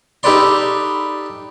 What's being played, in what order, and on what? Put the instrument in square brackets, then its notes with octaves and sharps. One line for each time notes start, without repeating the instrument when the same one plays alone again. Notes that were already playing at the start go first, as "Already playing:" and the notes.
[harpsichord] D#4 G4 A4 B4 D5 C6